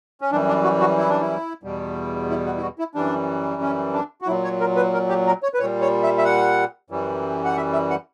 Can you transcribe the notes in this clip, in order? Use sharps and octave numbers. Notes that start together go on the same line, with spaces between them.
C#4
F#2 E3 G3 D4
D4
F#4
F#4
E4
D4
E4
E2 B2 G3
E4
F#4
E4
F#4
E4
F#2 E3 G3 D4
C#4
D4
F#4
A#2 F#3 E4
C#5
A#4
B4
A#4
G4
A#4
C#5
B4
A#2 G3 C#5
C#5
E5
E5
F#5
F#2 E3 G3
F#5
E5
E5
F#5